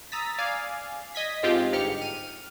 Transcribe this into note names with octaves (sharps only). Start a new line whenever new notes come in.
A#5 D#6 E6 A6 B6
D5 F5 G#5
D#5 G#6 B6
G#2 F3 G#3 C4 F4 G4
G1 G#2 G4 F6 C#7
F6 D#7